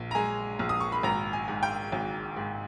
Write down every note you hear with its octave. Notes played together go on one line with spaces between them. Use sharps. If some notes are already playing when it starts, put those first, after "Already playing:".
Already playing: A#1
A#5
G#3 G#5
A#1
D#6
C#6
B5
G#1 A#5
G#5
G#2
G5
G#1
G#2